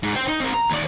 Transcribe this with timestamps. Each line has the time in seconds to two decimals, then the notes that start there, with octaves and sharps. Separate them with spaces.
0.03 G#2
0.16 C5 G5
0.28 D#4
0.40 C4 A#4
0.54 A#5
0.70 D#2 D5